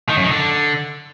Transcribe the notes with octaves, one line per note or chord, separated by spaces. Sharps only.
D#3
F#2
D#3
D3